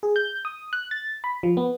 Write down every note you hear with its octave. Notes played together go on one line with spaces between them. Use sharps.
G#4
G6
D#6
F#6
A6
B5
F3
B3